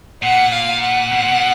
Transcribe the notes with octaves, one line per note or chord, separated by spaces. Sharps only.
A#2 F#5
F5
F#5
B2
A#2
B2